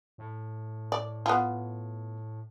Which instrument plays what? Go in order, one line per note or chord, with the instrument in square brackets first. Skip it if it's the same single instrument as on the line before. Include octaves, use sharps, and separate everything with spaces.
[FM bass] A2
[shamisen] D5
B3 F4